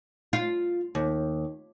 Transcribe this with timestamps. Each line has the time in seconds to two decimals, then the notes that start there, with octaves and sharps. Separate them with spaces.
0.33 F4
0.95 D#2